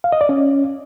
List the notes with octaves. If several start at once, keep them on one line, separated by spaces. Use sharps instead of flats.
F5
D#5
D5
C#4